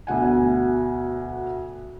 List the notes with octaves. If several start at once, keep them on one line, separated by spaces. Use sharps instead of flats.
D2 B2 F#5 G#5